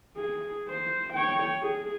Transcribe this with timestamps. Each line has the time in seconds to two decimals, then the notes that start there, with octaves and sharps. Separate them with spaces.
0.17 G#4
0.69 C5
1.13 C#5 G5
1.63 G#4